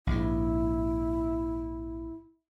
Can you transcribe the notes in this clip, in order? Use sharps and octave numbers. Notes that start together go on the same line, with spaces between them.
A#1 G#2 E4